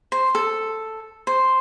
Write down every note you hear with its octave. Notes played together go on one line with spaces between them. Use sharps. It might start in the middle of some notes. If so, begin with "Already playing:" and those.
C5
A4
C5